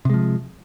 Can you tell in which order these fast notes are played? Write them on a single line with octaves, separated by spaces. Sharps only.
C3 G#3 F3